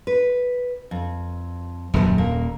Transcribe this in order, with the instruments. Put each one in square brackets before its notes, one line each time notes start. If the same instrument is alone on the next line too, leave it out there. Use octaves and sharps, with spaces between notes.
[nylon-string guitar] B4
F2
[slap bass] D#1 [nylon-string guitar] F#2 A#4 A5
[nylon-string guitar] A#3